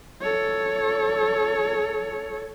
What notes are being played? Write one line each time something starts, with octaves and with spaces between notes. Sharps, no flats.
A4 C#5